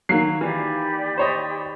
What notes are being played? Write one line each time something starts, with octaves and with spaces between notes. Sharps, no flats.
D#3 F#3 A#3 C7
E3 G4 D5 B5
C5 C#5 D#5